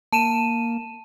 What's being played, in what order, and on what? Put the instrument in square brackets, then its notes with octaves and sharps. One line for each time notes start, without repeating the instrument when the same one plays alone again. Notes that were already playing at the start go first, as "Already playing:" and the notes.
[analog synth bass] A#3 [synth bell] A5 D#7 E7